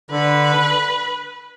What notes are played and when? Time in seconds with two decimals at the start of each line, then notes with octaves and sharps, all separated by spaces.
0.11 D3 B4